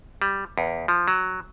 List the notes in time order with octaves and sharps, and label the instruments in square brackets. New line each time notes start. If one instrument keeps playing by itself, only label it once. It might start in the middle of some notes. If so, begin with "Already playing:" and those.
[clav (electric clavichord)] G3
E2
F3
F#3